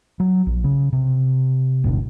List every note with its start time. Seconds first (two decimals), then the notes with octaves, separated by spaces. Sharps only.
0.20 F#3
0.46 A#1
0.64 C#3
0.93 C3
1.84 D1 G1 B2 D4